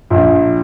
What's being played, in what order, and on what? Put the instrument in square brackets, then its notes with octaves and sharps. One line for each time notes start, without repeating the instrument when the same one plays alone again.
[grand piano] A#1